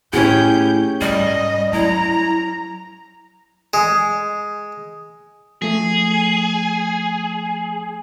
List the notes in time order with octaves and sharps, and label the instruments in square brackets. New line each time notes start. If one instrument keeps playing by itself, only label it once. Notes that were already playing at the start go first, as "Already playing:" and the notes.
[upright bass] A2 [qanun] C#4 G4 G#4 [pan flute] E4 [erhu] G6
[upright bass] G#2 C3 [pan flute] G3 [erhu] D#5
[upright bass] F#3 [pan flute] E4 [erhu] A#5
[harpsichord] G#3
[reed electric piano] F3 A3 [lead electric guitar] G#4